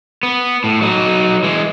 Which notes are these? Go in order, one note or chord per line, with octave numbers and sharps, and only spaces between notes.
B3
A2
F#3 D#4
E3 G#3